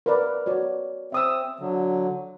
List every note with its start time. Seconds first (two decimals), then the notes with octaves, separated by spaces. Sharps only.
0.06 A#4 B4 D5
0.46 F#4 C#5 D5
1.12 C4 E5 D#6 E6
1.60 D3 F#3